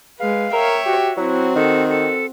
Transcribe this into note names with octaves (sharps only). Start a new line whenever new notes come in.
G#3 B4 F5
A#4 C#5 E5 G5
F#4 G4
F#3 C4 E4 F#4
D#3 A4
A4